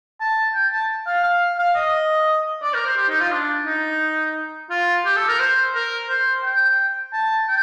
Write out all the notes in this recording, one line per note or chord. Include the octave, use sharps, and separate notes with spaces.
A5
G5
A5
F5
F5
F5
D#5
D5
A#4
C5
G4
D#4
F4
D4
D#4
F4
G4
A4
A#4
C5
A#4
C5
G5
A5
G5